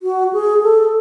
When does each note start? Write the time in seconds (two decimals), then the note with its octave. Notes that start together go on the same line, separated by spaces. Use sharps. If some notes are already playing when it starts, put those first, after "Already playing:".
0.03 F#4
0.33 G#4
0.63 A4